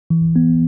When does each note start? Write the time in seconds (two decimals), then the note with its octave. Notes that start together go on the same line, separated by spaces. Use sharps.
0.10 E3
0.36 B3